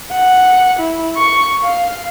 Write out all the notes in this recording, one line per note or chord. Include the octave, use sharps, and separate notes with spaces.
F#5
E4
C#6
F5